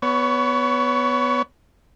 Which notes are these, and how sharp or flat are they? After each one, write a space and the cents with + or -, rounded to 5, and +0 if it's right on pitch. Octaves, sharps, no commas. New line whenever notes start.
B3 +5 C#5 +25 C#6 +5